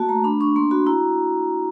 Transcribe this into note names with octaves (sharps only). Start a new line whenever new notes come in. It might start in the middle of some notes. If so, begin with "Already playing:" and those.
Already playing: A#3 F#4 A5
A3 A#5
D4 B5
D4 C#6
A#3 C6
F#4 B5
E4 A#5